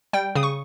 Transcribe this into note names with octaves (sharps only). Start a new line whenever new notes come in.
G3 G5
C#3 D#6
C#6